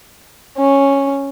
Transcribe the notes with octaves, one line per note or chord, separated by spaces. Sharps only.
C#4